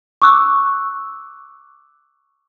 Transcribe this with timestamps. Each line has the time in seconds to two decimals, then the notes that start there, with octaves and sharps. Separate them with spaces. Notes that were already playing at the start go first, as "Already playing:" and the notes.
0.22 C#6 D6 E6 F#6